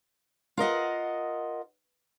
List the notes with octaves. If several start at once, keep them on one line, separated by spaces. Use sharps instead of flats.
F4 A#4 D#5 F#5